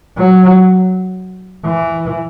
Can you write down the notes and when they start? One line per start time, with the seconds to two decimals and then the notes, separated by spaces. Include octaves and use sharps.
0.18 F#3
1.65 E3